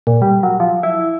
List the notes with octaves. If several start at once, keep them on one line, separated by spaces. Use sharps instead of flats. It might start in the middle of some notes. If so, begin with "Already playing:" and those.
A#2
G3
F#3
F3
E4